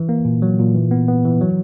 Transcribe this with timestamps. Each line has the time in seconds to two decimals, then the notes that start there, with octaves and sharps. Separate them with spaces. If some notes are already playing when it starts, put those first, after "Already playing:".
Already playing: E3
0.09 A#3
0.25 A#2
0.42 F#3
0.59 A#2
0.75 E3
0.91 B3
1.08 B3
1.25 E3
1.41 F#3